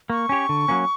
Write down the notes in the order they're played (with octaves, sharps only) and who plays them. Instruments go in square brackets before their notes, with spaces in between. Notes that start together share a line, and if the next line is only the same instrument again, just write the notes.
[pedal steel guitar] A#3 [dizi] C#6
[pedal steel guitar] C#4 G4 C#5
D3
F#3 A#3 C#4